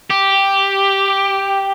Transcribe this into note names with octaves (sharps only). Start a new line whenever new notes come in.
G4